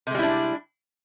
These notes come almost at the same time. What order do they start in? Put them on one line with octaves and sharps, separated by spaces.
C3 G#3 G3 E4 D4